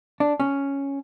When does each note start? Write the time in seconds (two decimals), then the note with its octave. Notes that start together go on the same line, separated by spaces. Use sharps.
0.20 D4
0.40 C#4